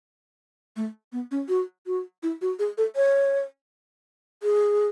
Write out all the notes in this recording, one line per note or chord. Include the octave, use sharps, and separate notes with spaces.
A3
B3
C#4
F#4
F#4
E4
F#4
G#4
A4
C#5
G#4